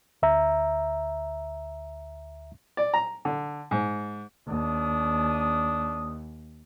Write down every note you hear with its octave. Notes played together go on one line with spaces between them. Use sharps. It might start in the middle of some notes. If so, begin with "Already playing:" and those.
D2 E5 A#5
D5
A#5
D3
G#2
D#2 D4 D#6